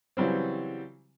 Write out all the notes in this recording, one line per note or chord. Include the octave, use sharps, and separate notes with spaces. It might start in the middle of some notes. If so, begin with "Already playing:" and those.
C#3 E3 F#3 G3 C4